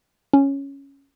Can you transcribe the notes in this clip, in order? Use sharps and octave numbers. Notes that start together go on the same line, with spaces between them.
C#4